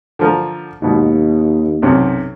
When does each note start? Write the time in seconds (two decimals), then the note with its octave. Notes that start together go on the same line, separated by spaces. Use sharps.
0.19 D3 F3 A#4
0.82 D#2 G#2 B2
1.82 B1 F#2 C3